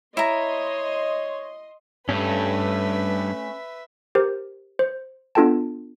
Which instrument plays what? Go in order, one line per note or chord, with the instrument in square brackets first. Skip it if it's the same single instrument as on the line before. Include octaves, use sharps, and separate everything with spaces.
[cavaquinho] E4 A#5 [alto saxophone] C#5 [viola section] D#5 C6
[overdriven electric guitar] G2 [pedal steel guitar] A3 C#4 [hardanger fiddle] B4 E5
[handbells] G4 A#4 C5
C5
B3 D4 F4 A4 G5 A5